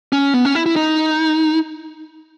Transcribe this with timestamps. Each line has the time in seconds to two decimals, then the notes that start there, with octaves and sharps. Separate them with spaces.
0.13 C#4
0.34 B3
0.45 C#4
0.55 E4
0.66 E4
0.76 D#4